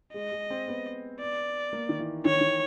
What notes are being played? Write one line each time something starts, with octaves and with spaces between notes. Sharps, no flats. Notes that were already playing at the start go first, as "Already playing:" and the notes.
G#3 D#5
G#3
C4
B3
D5
A#3
D#3
E3
D#3 C#5
E3
D#3